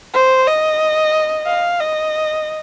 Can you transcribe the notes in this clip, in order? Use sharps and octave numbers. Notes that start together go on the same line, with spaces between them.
C5
D#5
F5
D#5